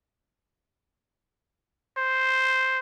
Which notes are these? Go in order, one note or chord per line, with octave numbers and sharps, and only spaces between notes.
C5